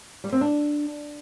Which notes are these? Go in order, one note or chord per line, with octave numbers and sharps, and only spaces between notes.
G3
C4
D4